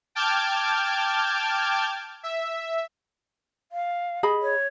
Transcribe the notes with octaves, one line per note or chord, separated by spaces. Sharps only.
G5 A5 D6 F6 G6 G#6
E5
F5
G#4 D#5 B5
C#5